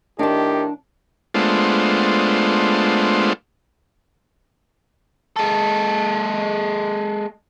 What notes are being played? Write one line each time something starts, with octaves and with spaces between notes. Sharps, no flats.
A2 D#3 D4 G4 A5
G#3 A3 B3 D4 F4 C5
G#3 A4